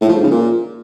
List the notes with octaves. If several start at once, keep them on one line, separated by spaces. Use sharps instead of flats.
A2
F3
G#2
C#3
A#2